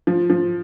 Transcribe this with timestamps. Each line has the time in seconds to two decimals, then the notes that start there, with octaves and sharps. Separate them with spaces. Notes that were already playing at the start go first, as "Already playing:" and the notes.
0.07 F3
0.30 F3